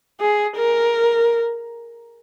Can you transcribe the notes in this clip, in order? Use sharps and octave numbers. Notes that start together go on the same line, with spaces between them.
G#4
A#4